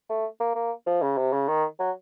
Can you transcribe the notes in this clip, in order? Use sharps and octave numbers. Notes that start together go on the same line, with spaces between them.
A3
A#3
A#3
F3
C#3
C3
C#3
D#3
F#3